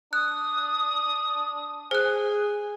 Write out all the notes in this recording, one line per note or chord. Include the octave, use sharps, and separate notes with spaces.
D4 D#6 F#6
G#4 C5 G#5 F#6